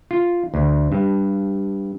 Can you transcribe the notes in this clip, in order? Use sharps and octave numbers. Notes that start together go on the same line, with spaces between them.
F4
D2
G2